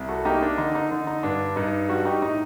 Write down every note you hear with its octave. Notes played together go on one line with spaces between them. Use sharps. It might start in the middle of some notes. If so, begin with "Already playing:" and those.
Already playing: C2
F#4 A4
A#3 D#4 G4
D4
D3 D#4
D#4
D3 D#4
D#4
G2 D4
G2 D#4
G3 D4 F#4
D#4 G4
A2 D#4